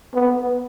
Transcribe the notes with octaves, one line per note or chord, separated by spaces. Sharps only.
B3